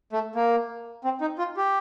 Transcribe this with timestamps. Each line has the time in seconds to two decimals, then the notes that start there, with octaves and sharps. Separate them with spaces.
0.12 A3
0.35 A#3
1.04 C4
1.21 D#4
1.38 F4
1.57 G4